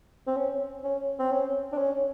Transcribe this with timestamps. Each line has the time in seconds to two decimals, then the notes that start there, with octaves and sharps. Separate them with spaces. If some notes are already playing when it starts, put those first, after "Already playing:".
0.27 C4
0.36 C#4
0.84 C#4
1.19 C4
1.31 C#4
1.72 D4
1.78 C#4